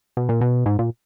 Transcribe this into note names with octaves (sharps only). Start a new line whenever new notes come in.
B2
A#2
B2
G#2
A#2